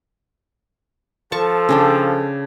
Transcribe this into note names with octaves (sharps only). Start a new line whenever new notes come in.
F3 A4 A5 C#6
C#3 D4 G5